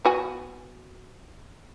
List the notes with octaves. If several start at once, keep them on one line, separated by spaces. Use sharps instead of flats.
B3 F#4 G#5